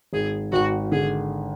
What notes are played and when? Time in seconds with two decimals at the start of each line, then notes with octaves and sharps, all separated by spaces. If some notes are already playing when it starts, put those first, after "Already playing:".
0.13 G#1 G#4
0.52 G#1 F#4
0.92 D3 G#4